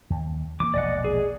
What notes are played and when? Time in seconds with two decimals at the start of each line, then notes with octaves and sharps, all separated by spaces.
0.10 D#2
0.60 E3 F#3 A#3 D6
0.74 E1 A#1 D5 D#5 F#5
1.04 G#4